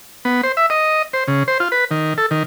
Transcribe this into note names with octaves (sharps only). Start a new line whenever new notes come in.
B3
C5
E5
D#5
C5
C#3
C5
F4
B4
D#3
A4
D#3